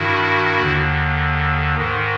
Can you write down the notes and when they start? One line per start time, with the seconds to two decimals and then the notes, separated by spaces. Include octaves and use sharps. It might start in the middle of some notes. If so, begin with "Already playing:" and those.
Already playing: G2 D#3 E4 F#4
0.59 D#2 D3
1.76 G#2 D#3